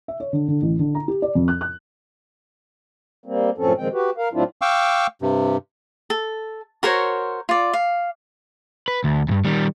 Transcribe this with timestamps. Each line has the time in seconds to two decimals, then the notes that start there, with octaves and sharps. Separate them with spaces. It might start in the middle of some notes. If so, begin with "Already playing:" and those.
0.08 E5
0.20 C#5
0.33 D3
0.48 D3
0.62 A1
0.79 D3
0.95 A#5
1.08 G4
1.22 D5
1.35 F2
1.48 F#6
1.61 F#6
3.26 G3 A#3 C4
3.58 F#2 A2 F3 C4 C#4 A4
3.78 A#2 D#3 F3 G#3 C4 G5
3.93 F#4 G4 B4
4.17 A#4 F5
4.33 A2 F#3 C4 D4 E4 F4
4.62 F5 G5 C#6 D6 E6
5.22 G2 C3
6.10 A4
6.83 F#4 A#4 C5 C#5
7.49 F4 D5
7.73 F5
8.88 B4
9.04 D2
9.28 E2 G2
9.45 D#3 G3